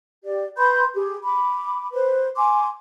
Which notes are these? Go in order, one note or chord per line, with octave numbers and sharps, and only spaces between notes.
G4 D5
B4 B5 C6 G6
G4 G#4
B5 D6
B4 C5
G#5 C6 D6